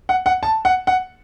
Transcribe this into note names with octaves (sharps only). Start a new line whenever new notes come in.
F#5
F#5
A5
F#5
F#5